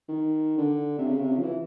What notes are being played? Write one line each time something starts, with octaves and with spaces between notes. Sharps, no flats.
D#3
D3
C3
C#3
C3
C#3
F3
E3